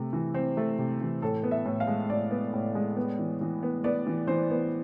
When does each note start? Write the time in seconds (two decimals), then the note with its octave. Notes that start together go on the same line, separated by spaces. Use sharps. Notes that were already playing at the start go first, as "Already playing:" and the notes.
Already playing: C3 A3
0.13 E3
0.34 C4
0.57 A3
0.79 C3
1.01 E3
1.22 A2 A4
1.43 B3
1.51 E5
1.65 A2
1.80 F5
1.87 G#3
2.10 A2 D5
2.31 B3
2.53 A2
2.75 G#3
2.97 B3
3.19 E3
3.41 E3
3.63 B3
3.84 B3 D5
4.07 E3
4.27 E3 C5
4.50 B3